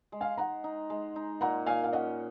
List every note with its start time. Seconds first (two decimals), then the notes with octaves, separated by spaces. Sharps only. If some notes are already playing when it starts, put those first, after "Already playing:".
0.12 G#3
0.21 F5 G#5
0.37 D#4 F#5 A#5
0.64 D#4
0.90 G#3
1.16 D#4
1.41 A#2 F#5 A#5
1.66 A#2 F5 G#5
1.84 F5
1.93 C#4 D#5 F#5